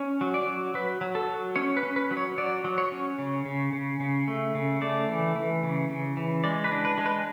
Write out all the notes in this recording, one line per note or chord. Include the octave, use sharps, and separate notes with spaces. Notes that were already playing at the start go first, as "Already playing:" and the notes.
Already playing: C#4
F#3
D5
F#3
F#3 B4
F#3
A4
F#3
C#4 C#5
B4
C#4
B4
F#3
C#5
F#3 D5
F#3
C#5
C#4
C#3
C#3
C#3
C#3
A3
C#3
A3 D5
E3
E3
C#3
C#3
E3
G#3 D5
B4
D4
B4
G#3
B4